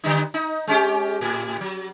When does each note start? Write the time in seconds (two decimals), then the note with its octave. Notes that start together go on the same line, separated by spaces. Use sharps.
0.04 D3 G3 D#4
0.34 D#4
0.67 G#3 C#4 G4
1.21 A2
1.61 F#3